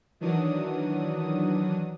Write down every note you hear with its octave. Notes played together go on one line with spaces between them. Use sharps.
D#3 E3 F#3 D4 D#6